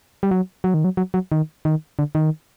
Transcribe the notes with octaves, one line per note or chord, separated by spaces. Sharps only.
G3
F#3
F#3
D#3
F#3
F#3
F#3
D#3
D#3
D3
D#3